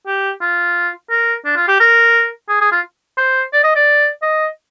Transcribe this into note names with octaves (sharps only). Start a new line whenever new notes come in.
G4
F4
A#4
D4
F4
G4
A#4
G#4
G#4
F4
C5
D5
D#5
D5
D#5